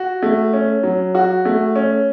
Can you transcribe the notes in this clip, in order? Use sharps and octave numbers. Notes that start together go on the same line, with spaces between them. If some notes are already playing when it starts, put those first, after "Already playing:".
Already playing: F#4
A3
C#4
F#3
F#4
A3
C#4